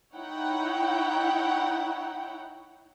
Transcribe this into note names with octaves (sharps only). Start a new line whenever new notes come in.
D#4 E4 C#5 F#5 G5